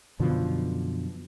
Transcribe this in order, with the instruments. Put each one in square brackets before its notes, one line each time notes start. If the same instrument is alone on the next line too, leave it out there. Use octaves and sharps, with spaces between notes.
[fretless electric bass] F#2 B2 D3 F3